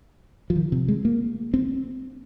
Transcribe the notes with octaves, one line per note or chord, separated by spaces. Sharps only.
F3
D#3
C3
G#3
A#3
C4